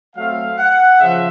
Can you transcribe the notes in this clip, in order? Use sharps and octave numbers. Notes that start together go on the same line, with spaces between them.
F#3 A3 C4 F5
F#5
C#3 F3 E5